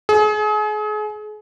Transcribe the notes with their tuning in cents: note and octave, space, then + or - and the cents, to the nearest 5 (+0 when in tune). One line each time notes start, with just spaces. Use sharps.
G#4 +35